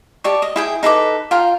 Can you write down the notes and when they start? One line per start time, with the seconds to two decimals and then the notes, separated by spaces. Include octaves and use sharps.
0.24 G4 D5 A5 C#6
0.42 D#5
0.56 E4 G#4 G5
0.83 D#4 A4 B4 D6
1.31 F4 A#4 G5